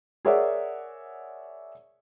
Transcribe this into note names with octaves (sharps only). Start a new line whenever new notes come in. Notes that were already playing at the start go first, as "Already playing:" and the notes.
G#4 A#4 C#5 D5 E5 F#5